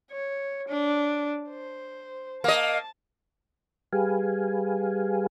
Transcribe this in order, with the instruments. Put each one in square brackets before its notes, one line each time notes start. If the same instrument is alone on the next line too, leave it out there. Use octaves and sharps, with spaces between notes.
[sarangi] C#5
D4
C5
[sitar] A#3 D#5 [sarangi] A5
[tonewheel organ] G3 G4 G#4 B4 F5 G#5